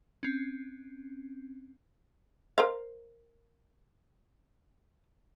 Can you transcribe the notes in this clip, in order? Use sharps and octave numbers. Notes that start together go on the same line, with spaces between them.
C4 C#4
A#4 C5 F5